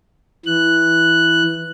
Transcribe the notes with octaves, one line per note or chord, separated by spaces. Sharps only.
E3 F#6